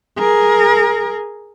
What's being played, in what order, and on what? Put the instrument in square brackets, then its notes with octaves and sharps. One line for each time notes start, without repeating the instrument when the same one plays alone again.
[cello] G#4 A#4